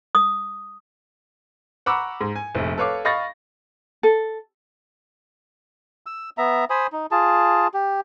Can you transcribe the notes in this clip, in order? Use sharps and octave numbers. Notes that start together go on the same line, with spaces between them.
D#6
F#5 A#5 B5 C#6 D6 E6
G#2
G#5
F1 A#1
A4 B4 C#5 F5 D6
D#5 F5 B5 C#6 A6 A#6
A4
E6
B3 E5 A#5
C5 G#5 B5 D#6
D#4
F4 G#4 A5
G4